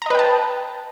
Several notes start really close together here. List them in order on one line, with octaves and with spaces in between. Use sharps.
A#5 D#5 B4 G5 A5